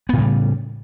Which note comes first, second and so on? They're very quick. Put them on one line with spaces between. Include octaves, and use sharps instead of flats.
B3 A2 C#3 G3